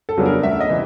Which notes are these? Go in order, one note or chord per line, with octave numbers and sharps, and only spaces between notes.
A4
C#3 F#3 B3 D4
A#4
D2 E5
D#5
C3 E3 G3